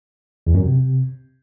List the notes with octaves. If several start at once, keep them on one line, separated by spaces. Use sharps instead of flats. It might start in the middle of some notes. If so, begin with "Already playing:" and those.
E2
F#2
C3